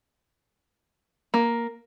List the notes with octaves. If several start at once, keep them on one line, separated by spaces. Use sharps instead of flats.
A#3